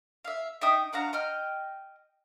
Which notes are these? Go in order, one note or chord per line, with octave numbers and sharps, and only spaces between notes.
E5 F5
D#4 E5 G5 D#6
D4 F#4 F5 A#5
D#5 G5 F6